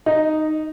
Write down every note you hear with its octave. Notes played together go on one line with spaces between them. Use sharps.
D#4